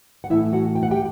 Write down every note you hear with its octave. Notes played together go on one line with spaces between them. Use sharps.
F#5
A2 E3 A3 E4 E5
F#4 F#5
G5
F#5
G4 G5